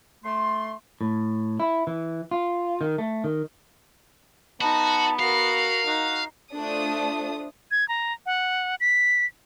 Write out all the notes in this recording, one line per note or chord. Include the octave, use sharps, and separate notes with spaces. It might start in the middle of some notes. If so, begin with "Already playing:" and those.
A3 C6
A2
E4
E3
F4
D#3
A3
D#3
B3 D#4 F#4 A5
F#4 A#4 F5 C7
D#4 F#4
A3 D4 F4 C5 D#6
G#6
A#5
F#5
B6